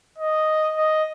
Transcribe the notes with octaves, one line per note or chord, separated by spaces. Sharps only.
D#5
D#5